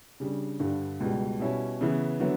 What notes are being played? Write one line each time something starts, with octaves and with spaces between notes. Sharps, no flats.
C#3 G3 D4
G2 D3 G3
C#2 B2 G3
B2 G3 C#4 E4
C#3 E3 B3 E4
D3 F#3 B3 E4